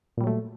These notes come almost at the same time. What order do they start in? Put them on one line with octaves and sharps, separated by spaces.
A#2 G3 F#3 A3